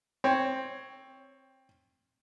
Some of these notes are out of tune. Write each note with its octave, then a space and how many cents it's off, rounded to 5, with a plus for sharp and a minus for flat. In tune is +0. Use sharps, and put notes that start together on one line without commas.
C4 +10 C#5 +0